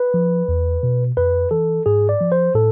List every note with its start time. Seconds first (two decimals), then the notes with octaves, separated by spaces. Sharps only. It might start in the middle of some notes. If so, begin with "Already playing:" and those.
Already playing: B4
0.14 F3
0.48 E2
0.83 B2
1.17 F2 B4
1.51 E3 A4
1.86 G#2 G#4
2.09 D5
2.21 F3
2.32 C5
2.55 A2 A4